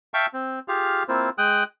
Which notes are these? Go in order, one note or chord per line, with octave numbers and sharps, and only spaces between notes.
E5 F5 G5 A5 C#6 E6
C4
F4 G4 G#4 F5 F6
A#3 C4 E4 F4 C5
G#3 G5 D#6 F#6